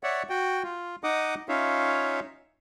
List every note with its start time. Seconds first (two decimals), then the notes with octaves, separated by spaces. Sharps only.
0.03 C#5 D5 E5 F#5
0.29 F#4 G5
0.63 F4
1.04 D#4 D#5 F#5 D6 D#6
1.49 C#4 D#4 F4 C#5 E5 F5